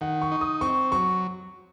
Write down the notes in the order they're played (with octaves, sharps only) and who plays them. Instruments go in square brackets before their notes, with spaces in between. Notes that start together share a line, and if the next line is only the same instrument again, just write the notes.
[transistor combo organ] D#3 [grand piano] F#5
[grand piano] C#6
[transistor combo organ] D#4
[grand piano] D#6
[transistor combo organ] C4 [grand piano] C#6
[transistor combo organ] F#3 [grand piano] C#6